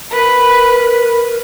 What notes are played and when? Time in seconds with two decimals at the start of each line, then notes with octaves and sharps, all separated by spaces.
0.11 A#4 B4